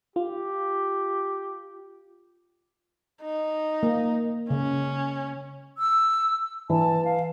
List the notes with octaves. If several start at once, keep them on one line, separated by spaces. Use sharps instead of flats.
F4 G4
D#4
A#3
C#3 C#4
E6
E3 A5
F5